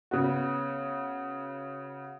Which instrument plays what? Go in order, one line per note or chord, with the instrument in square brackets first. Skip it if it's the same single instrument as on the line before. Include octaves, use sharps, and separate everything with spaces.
[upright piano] C#3 B3 F#4